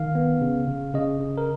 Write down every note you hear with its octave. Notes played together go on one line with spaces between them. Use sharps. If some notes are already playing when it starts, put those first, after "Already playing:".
Already playing: D#3 F5
B3
C#3
C#3
C#3 D#5
C#3
A#4